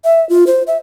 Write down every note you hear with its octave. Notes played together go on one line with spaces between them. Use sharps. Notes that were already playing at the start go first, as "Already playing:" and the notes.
E5
F4
C5
E5